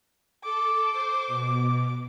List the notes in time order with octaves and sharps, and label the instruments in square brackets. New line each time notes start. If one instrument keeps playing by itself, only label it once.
[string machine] A4 [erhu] D6
[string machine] C5
B2